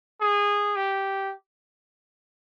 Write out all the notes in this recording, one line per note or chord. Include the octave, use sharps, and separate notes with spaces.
G#4
G4